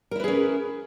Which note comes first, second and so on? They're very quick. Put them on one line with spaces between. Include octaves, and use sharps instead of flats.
A#4 E4 B4 G#4 C#4